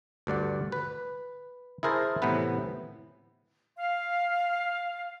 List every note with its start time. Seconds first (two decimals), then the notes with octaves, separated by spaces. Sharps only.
0.27 D2 G2 D5 F#5
0.72 B4
1.83 E4 G#4 A#4 C5 A5 A#5
2.22 A2 C3 E3 B3 B4
3.76 F5